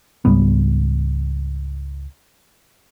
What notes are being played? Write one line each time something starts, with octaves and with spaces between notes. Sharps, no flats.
C#2 G#2 G3 B3